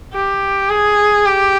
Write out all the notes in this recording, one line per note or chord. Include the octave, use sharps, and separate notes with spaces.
G4
G#4
G4